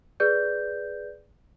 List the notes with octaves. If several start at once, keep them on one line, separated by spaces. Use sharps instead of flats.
G#4 B4 D5 G6